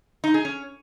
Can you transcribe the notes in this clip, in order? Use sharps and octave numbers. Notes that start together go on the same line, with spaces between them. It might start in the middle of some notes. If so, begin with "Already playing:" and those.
D#4
G#4
C#4